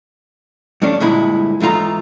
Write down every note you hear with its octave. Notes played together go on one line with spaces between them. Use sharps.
G2 A3 C#4 D4
D2 G2 A#2 G#3 E4 B5
E2 G#2 A3 F4 A#5